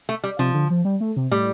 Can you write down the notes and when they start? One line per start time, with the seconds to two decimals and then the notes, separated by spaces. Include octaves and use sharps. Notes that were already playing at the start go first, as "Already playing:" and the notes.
0.09 A3
0.24 G3
0.39 C3 F3
0.54 D3
0.70 F3
0.85 G3
1.00 A3
1.16 C3
1.31 A2 G3